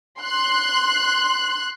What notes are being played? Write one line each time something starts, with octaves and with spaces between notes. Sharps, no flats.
C6 F#6